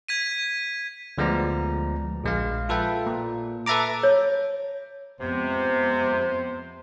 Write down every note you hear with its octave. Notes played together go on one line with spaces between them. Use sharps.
G#6 B6 D#7
D2 F3 G#3 B3 D5 A#5
A#1 G#3 F5
F4 A4 B4 E5 G5
A#2
A4 B4 E5 A5 A#5 D6
C#5
F2 C3 G#3 B3 C5